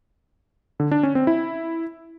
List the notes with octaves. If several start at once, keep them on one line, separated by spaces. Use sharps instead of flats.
D3
D4
C#4
C4
E4